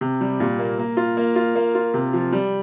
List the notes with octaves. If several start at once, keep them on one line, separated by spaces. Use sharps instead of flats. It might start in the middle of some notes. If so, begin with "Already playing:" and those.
C3
G3
A#2
A#3
A#3
F4
A#3
F4
A#3
F4
C3
F3
G3